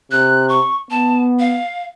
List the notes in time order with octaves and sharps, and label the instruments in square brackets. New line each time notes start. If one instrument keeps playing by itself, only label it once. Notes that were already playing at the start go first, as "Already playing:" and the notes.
[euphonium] C3 [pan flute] F#6
[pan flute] C#6
[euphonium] B3 [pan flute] A5
[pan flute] F5